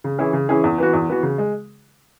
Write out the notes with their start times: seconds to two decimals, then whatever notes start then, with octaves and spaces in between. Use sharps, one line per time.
0.04 C#3
0.18 E3 C#4 E4 G#4
0.33 C#3
0.49 E3 C#4 E4 G#4
0.64 E2
0.78 E3 B3 F#4
0.93 E2
1.09 E3 B3 F#4
1.23 C#3
1.38 G#3